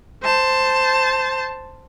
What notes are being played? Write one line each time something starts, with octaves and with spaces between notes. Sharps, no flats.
C5 A5